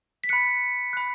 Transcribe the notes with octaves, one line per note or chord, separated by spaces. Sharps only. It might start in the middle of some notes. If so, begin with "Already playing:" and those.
B6
B5 F#6 C#7
B5 F#6